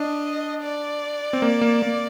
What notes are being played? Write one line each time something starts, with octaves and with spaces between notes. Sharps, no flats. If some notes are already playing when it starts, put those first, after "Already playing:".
Already playing: D4 D#5
D5
C4
A#3
A#3
A#3